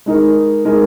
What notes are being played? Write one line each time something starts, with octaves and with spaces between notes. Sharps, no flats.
G#3 D#4 A#4
G#3 D#4 A#4